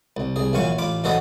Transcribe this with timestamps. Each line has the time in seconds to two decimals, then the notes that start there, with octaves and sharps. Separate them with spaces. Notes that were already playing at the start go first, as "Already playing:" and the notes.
0.17 C2
0.36 C2 G#4
0.53 A#1 F#2 E3 F4 G#5 C#6
0.78 A1 F4 B5 D6
1.04 B1 E3 F#4 A4 C5 D#5